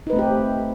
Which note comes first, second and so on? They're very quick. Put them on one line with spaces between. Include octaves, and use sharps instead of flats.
D#4 B4 A3 C4 G4